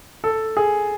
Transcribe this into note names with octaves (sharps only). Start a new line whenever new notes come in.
A4
G#4